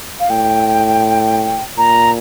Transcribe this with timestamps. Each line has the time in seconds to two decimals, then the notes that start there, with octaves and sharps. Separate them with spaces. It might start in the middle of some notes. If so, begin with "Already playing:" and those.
0.20 F5
0.30 A2 G5
1.77 A#2 A#5